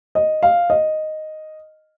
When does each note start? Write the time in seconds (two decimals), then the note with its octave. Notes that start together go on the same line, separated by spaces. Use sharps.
0.15 D#5
0.43 F5
0.70 D#5